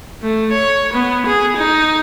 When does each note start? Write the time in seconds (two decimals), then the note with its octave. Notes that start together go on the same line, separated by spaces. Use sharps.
0.23 A3
0.52 C#5
0.93 B3
1.26 G#4
1.56 D#4